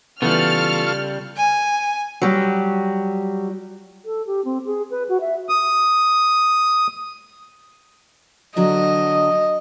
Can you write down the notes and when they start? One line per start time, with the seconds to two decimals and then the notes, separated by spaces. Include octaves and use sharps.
0.22 C#3 E3 G3 B3 F4 A4 C#6 F6
1.37 G#5
2.22 F#3 G3
4.05 A4
4.27 G4
4.45 C4
4.66 G#4
4.91 B4
5.09 F#4
5.21 E5
5.49 D#6
8.56 D3 F#3 D4 D#5